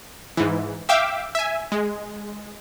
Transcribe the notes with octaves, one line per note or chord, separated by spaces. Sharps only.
G#2 E3
E5 F5 G5 D6 E6
E5 G#5
G#3